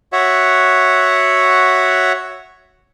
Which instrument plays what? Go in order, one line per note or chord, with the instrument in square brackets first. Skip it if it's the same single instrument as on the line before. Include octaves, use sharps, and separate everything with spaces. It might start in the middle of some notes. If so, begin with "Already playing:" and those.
[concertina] F#4 C#5 E5 F#5